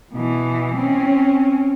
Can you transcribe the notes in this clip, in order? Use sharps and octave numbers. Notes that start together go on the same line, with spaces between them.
B2 E3
C4 C#4